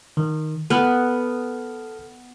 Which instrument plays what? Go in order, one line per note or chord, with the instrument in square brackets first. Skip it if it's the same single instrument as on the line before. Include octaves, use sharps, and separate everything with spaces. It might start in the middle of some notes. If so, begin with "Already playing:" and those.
[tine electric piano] D#3
[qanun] B3 [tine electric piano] A4 F6